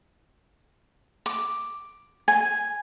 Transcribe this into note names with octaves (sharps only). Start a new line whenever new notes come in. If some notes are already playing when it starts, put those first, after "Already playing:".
D6
G#5